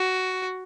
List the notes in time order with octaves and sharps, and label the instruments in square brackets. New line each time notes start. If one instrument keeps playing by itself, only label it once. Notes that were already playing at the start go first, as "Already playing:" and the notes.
Already playing: [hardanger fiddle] F#4